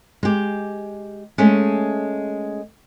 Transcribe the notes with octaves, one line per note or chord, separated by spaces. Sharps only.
G#3 G4
G#3 A3 C#4